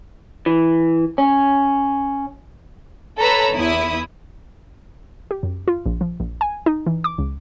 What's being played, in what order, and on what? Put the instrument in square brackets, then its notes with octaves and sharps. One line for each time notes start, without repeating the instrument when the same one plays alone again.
[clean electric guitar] E3
C#4
[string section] A4 B4 C#5 A#5 B5 E6
E2 E4 D#6
[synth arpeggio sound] G4
F#2
F4
A#1
F3
A#1
G#5
D#4
E3
D6
C#2